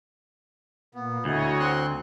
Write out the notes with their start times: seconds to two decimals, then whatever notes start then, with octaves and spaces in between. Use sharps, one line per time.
0.95 A#2 A#3 B3
1.25 D2 E4 F#4 C#5 D#5
1.60 C4 C6 F#6